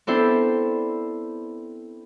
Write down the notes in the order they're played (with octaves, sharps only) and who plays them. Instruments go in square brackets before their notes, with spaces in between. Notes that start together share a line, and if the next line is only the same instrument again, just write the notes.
[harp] B3 C4 D4 E4 A4 C5